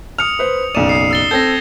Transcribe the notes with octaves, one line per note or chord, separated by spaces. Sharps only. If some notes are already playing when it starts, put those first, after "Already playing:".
D#6 F6 C#7 F7
B4 C5
F#1 B1 D5 D#7 E7
D#6 C7
E6 A6 G7
C4 A4 G6 G#6 A#6